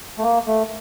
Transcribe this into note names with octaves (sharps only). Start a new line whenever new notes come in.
A3
A#3
A3